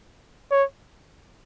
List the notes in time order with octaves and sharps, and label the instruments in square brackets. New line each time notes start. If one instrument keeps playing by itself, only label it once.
[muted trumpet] C#5